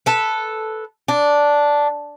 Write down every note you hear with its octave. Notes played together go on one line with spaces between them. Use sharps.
A4 B4
D4